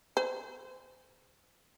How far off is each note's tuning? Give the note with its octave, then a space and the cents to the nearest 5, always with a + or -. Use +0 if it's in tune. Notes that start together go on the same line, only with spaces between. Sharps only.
C5 -30